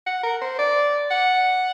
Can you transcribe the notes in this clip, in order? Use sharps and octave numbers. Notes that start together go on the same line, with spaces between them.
F#5
A#4
C5
D5
F#5